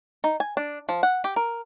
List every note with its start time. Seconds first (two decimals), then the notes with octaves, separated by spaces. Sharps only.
0.24 D#4
0.40 G#5
0.57 D4
0.89 F3
1.03 F#5
1.24 G4
1.36 A#4